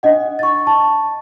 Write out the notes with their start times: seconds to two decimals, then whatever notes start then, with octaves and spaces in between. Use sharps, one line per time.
0.03 D4 D#5 F#5
0.39 C#6 A6
0.67 A5